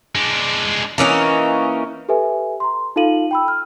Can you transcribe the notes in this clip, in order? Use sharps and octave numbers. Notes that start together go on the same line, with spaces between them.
G#3 D4
E3 A#3 C#4 D#4
G4 A4 B4 E5 G#5
A#5 C6
D#4 F4 A4 F5 D#7 F#7
G5 B5 E6
F6